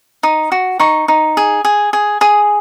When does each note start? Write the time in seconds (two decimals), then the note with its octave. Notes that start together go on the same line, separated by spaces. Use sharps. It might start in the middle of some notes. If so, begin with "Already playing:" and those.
0.23 D#4 D#6
0.52 F#4
0.79 D#4 C#6
1.08 D#4
1.37 G#4
1.65 G#4
1.93 G#4
2.21 G#4 D#6